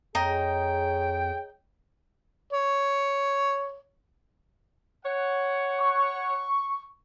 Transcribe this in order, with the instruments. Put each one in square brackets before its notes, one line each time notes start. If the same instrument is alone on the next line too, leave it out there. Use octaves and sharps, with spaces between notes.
[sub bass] F2 [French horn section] G#4 C#5 [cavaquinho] D#5 A#5 [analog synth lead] G5
[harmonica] C#5
[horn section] C#5 F#5
[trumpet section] C#6